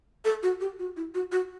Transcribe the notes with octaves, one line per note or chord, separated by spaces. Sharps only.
A4
F#4
G4
F#4
E4
F#4
F#4